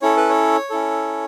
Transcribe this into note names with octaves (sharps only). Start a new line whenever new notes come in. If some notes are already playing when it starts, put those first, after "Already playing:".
C#4 E4 A4 C#5
B4
C#5
C#4 E4 A4